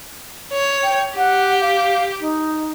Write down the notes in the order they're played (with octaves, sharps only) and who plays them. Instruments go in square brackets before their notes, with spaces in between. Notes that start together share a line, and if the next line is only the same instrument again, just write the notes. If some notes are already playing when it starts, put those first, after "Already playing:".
[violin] C#5
[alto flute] G5
[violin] G4 [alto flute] F#5
[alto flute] F5
D#4